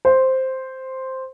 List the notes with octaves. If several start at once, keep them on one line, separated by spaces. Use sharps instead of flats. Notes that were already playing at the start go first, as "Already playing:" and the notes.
C5